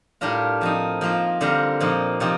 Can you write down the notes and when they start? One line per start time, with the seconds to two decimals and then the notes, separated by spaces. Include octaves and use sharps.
0.21 A2 G3 D4 F4 A#4
0.61 F3 C4 D#4
1.01 F3 A#3 F4 C5
1.41 D3 G3 C4 F4 A#4
1.80 A#2 F3 C4 D#4
2.20 C3 F3 C4 D#4